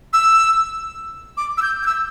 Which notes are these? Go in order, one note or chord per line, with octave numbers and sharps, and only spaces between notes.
E6
D6
E6
G6
G6
E6